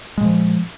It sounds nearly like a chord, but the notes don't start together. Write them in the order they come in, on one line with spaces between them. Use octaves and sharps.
G#3 A#2 F3